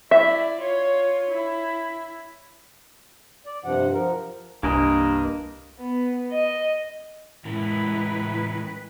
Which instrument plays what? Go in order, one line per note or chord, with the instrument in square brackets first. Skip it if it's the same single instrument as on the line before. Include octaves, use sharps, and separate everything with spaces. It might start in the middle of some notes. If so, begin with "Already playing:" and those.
[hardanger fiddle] E4 D5 [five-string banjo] E5
[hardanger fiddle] F4 C#5
E4
[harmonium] D5
G2 C3 F3 F#5
F3 A#4
[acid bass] C2 [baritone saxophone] G2 [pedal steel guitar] A#3 A#4 D#5 [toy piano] D4
[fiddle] B3
D#5
[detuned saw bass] A2 [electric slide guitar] E3 C#4 A#4 [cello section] G#3 B4 [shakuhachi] E4